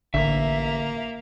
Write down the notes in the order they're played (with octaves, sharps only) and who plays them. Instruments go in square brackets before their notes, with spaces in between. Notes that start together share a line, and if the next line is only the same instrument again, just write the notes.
[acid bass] A1 [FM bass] D3 [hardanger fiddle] A#3 [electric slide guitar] E5